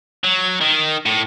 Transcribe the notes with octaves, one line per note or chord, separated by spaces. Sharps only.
F#3
D#3
A2